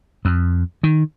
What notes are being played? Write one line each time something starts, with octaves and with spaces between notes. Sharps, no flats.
F2
D#3